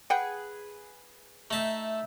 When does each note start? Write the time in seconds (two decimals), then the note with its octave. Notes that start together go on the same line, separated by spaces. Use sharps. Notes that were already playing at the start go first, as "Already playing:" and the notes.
0.10 G#4 B4 F#5 G5
1.51 A3 D#4 E5 A5